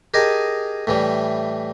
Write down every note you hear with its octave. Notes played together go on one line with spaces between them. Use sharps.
G4 G#4 A#4 D#5 G#5 A5
A2 E3 G3